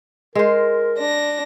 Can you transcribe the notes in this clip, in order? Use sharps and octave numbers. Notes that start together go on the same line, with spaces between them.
G#3 A#4 C5
D4 A#6